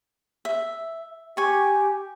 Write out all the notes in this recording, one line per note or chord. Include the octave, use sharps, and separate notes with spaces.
E5
G4 G#5 C#6